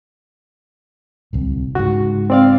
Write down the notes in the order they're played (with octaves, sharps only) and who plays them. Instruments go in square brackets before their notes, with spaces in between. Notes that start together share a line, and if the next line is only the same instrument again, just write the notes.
[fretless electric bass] D1 C2
[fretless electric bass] G#2 C#3 [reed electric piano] F#4
[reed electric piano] C4 D5 F5